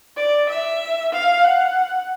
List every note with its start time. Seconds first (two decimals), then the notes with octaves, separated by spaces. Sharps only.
0.17 D5
0.49 E5
1.13 F5
1.44 F#5